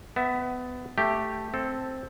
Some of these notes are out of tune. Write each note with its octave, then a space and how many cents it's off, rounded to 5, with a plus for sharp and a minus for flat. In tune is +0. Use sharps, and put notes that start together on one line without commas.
B3 +20 E5 +0
A3 +0 G4 +0
C4 +0 A4 +0